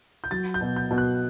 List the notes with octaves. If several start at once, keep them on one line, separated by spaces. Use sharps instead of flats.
G6
F#3 A6
G6
B2
G6
B2
F#6